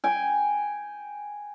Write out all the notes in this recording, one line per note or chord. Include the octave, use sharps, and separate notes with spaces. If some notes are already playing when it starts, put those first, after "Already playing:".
G5 G#5